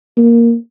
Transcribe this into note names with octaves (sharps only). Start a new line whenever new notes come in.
A#3